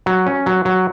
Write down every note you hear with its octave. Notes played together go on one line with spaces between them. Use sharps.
F#3
C#4
F#3
F#3